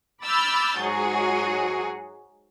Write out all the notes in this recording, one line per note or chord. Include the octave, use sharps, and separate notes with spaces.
B5 D6 E6 F6 G6 A6
G#2 F#3 F#4 G#4